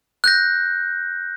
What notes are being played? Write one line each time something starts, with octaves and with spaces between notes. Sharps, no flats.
F#6 G6 A#6